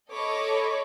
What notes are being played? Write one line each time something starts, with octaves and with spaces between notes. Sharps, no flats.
A4 C#5 D#5 B5 C#6 D6